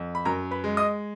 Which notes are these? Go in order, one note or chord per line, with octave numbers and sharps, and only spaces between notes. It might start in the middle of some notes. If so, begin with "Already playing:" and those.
Already playing: F2
B5
F#2 A#4 A#5
B4 B5
G#3
D#5 D#6